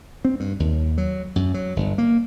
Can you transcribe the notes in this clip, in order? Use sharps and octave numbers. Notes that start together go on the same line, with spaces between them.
C4
G2
D#2
F#3
F#2
F#3
G1
A#3